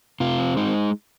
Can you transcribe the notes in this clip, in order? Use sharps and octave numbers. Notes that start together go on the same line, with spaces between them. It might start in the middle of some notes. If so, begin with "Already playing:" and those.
C3 F4
C4
G#3 D#4